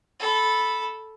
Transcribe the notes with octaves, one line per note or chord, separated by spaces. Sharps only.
A4 B5